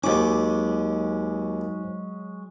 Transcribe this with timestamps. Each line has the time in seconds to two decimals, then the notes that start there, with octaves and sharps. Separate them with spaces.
0.04 D#2 F#3 G#3 C#4 D#4 F#4 C5 D6